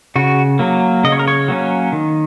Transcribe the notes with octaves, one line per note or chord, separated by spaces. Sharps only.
C#3 F#4
F#3 A#3
C#3 D#5
C#5
A#4
C#5
F#3 A#3 C#4
D#3